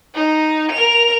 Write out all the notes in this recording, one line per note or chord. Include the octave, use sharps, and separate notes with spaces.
D#4
A#4 F7